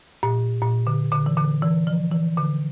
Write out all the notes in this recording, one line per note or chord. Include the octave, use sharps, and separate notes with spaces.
A#2
A#2
D3
D3
E3
D3
E3
F3
E3
D3